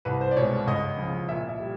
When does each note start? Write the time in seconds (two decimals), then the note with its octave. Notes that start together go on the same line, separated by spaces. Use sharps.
0.05 C2 B4
0.21 C5
0.31 D5
0.36 B2 C#5
0.40 G#3
0.67 C#2 D#5
0.97 C#3 F3
1.29 A#2 E5
1.49 E5
1.59 G3